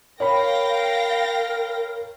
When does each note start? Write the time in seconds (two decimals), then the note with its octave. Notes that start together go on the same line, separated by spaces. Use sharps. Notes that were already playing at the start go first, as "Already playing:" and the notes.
0.20 A#4 C#5 F5 G5 B5 A#6